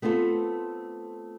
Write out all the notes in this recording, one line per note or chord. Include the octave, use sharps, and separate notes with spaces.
A3 B3 C4 F4 A4